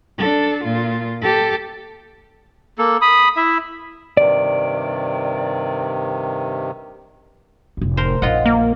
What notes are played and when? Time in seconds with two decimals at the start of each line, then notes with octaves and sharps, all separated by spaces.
0.18 D4 A4
0.63 A#2 F4
1.21 G4 A4
2.78 A#3 A4
3.01 B5 D#6
3.36 E4 E5
4.17 G2 C3 D#3 D5
7.77 F1 A2
7.97 A#4 C5
8.22 A#1 F#2 F4 D#5 F#5
8.46 A#3